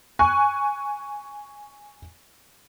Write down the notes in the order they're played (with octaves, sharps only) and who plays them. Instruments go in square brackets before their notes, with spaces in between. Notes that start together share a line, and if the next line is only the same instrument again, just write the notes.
[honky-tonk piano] G#5 C#6 F#6